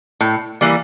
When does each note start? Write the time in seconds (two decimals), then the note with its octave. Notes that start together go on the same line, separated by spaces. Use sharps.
0.21 A2
0.61 E3 G3 A#3